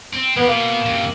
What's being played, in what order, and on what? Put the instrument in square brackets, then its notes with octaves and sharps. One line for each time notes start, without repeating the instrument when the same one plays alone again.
[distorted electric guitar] C4
[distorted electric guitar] A#3 G4 [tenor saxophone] B3
[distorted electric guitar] B2 [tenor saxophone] A#3
[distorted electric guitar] F#2 C3